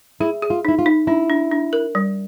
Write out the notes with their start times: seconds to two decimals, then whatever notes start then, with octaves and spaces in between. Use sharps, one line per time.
0.20 E4 G#4
0.42 G#4
0.50 F4
0.65 D#4 E4
0.79 F4
0.86 D#4
1.07 D4 E4
1.30 D4
1.52 D4
1.73 A#4
1.95 G3